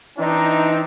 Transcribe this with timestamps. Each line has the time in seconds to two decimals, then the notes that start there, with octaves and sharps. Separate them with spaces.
0.18 E3 C4 D4 D#4